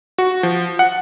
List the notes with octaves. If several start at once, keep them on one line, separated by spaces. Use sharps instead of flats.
F#4
F3
F#5